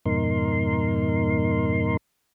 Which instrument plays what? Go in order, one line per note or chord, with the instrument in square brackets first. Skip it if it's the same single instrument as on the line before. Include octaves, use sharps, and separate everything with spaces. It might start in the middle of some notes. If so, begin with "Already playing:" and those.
[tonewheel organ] F2 G#2 B2 D#4 A#4 C6